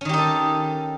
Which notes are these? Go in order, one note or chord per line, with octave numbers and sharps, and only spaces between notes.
D#3 C#4 D#4 G4 A4